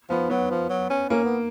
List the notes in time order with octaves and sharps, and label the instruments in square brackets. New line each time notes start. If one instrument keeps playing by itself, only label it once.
[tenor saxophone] F3 [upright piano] B3
[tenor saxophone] F#3 [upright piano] B3
[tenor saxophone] F3
F#3
C#4
[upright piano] A#3 [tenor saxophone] C#4
[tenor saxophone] B3